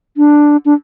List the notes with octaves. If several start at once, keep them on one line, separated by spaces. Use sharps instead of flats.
D4
D4